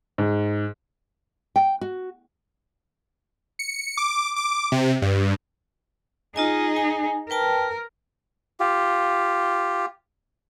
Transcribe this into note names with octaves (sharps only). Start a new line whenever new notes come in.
G#2
G5
F#4
C#7
D6
D6
C3
G2
D#4 F4 G#4 D#5 G#5
G#5
A#4 B4 G5 A5
F4 G4